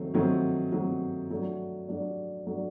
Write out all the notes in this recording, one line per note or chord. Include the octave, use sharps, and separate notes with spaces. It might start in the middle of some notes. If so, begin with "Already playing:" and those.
Already playing: D#3 F#3 A3 C4
D#3 F#3 A3 C4
D#3 F#3 A3 C4
F#3 A3 D4
F#3 A3 D4
F#3 A3 D4